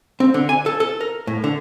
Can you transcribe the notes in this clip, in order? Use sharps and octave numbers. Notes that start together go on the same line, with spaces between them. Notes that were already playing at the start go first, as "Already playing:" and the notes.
C4
D3
G#5
A4
A4
A#4
A2
D3